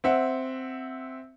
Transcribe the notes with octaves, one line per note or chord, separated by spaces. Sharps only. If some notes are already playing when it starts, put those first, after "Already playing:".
C4 E5 F#5